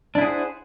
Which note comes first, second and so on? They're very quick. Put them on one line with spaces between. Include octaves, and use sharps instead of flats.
D4 E4 G#4 F#5 C5